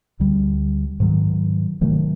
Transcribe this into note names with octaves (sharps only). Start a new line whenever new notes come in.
D2 D3 G3
G#2 D#3 F#3
C3 D#3 F#3 A3